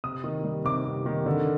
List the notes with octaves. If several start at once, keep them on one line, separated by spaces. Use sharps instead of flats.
C3 D#6
D#3
G3
C3 D6
C3
D#3
D3